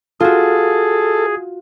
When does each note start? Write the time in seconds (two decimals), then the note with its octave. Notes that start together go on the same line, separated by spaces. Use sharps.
0.20 F4 F#4 G#4 A4